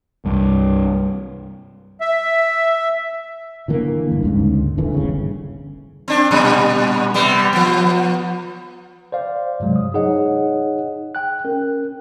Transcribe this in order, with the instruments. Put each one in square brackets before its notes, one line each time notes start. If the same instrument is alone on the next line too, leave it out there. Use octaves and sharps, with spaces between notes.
[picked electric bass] C2 G2
[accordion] E5
[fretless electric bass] D3 E3 A#3
G2
D2 G#2 C#3
D#1 D3 E3
G1 C#3
[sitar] C4 D4
A#2 G3
C3 G3 B3
F3 B3
[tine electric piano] C5 D5 F5
G2 C3 F#3 G#3
D#6
D#4 G#4 C#5 D#5 F#5
G5 F#6
C#4 A#4